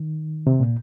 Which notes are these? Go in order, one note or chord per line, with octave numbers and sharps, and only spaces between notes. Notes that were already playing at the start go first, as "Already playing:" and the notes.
Already playing: D#3
C3
A#2